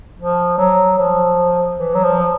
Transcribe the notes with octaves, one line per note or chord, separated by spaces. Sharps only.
F3
F#3
F3
E3
F#3
F3